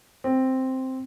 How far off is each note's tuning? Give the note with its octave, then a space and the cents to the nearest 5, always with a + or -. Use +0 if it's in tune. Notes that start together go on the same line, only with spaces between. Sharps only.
C4 +0